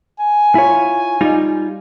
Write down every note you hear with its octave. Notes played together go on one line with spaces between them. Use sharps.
G#5
E4 F4 C#5
G3 D#4 F4